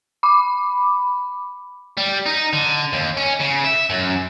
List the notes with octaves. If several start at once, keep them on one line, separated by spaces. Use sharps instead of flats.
B5 D6
G3
D#4
D3
D#2
C#4
C#3
E5
F#2